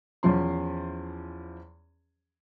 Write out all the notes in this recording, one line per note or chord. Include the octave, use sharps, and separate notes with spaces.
E2 E3 F3 C#4 C6